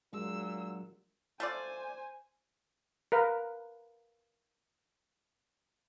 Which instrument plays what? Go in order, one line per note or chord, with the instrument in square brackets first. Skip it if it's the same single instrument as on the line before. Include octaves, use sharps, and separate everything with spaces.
[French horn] A#2 [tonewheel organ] F#3 [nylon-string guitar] G#3 D4 [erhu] E6
[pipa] A3 F4 D5 [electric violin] C5 G#5
[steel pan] A#4 B4 F5